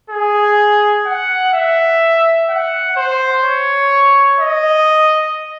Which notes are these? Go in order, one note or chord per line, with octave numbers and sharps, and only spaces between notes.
G#4
F#5
E5
F#5
C5
C#5
D#5